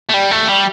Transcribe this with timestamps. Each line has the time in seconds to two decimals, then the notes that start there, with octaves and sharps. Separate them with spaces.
0.09 A3
0.13 G3
0.31 A3
0.49 G3